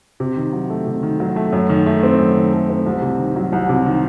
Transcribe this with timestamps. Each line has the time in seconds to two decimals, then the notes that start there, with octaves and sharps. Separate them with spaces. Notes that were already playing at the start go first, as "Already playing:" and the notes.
0.20 C3
0.37 D#3
0.53 F#3
0.70 A3
0.87 C3
1.03 D#3
1.20 F#3
1.36 A3
1.53 F#2
1.69 D#3
1.86 A3
2.03 C4
2.19 F#2
2.36 D#3
2.53 A3
2.70 C4
2.86 C2
3.02 C3
3.19 D#3
3.36 F#3
3.53 C2
3.69 C3
3.86 D#3